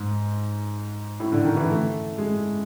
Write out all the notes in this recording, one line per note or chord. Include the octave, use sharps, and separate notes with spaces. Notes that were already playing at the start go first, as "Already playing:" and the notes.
Already playing: G#2
A2
D3
D#3
E3
A3
G#3